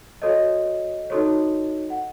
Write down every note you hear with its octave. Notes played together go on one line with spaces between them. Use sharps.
F#4 A4 C#5 D#5
D#4 F#4 A4 C#5
F#5